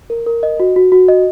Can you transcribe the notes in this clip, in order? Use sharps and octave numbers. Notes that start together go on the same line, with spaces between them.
A#4
A#4
D#5
F#4
F#4
F#4
D#5